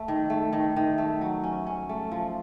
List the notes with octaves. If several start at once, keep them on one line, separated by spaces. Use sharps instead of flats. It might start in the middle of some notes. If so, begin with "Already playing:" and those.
Already playing: A3
D#3
A3
D#3
D#3
A3
F#3
C#4
C#4
A3
F3